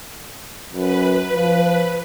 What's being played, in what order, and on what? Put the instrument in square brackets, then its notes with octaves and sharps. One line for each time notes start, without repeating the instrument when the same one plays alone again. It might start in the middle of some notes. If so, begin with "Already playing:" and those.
[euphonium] F#2 [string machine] B4
[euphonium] F3